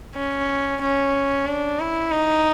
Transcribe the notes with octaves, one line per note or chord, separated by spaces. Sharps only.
C#4
C#4
D4
E4
D#4